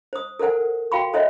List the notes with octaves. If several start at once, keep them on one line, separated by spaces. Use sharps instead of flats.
C5 D#6
A4 A#4 C5 F#5 G#5
F#4 F5 G5 B5 C#6
A4 C5 C#5 D#5 E5 F#5